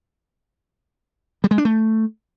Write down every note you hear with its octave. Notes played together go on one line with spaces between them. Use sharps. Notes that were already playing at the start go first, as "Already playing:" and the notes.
G3
G#3
D4
A3